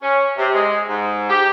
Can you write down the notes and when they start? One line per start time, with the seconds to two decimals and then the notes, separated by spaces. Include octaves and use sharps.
0.02 C#4
0.38 C3
0.55 G#3
0.89 G#2
1.29 G4